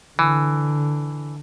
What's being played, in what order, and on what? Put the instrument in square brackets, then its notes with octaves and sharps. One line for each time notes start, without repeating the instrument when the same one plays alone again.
[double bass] D3 [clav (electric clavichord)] E3